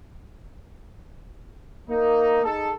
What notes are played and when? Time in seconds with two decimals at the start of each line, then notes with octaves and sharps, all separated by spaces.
1.88 A#3 D#4
2.43 D#4 G#4 A4